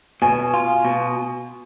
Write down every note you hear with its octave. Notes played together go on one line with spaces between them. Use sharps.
B2 G#5
F4
B2